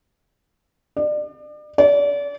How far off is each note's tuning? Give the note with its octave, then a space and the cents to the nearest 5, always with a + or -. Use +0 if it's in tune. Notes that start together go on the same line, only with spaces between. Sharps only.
D5 +35
D5 -35